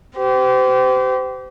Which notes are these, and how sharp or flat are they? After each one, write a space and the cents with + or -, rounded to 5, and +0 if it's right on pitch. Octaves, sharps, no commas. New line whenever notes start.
G4 -30 C5 -35